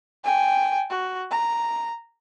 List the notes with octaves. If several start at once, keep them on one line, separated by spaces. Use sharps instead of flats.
G5 G#5
F#4
A#5